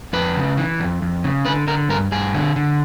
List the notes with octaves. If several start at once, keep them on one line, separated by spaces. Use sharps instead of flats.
F2 B4
C#3
E3
F2
F2
C#3
D3 B4
D3 A#4
G2 A#4
G2 G#4
D3
D3